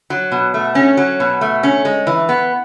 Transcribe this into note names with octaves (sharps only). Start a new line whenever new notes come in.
F#3
B2
A3
C#4
F#3
B2
A3
C#4
G#3
E3
B3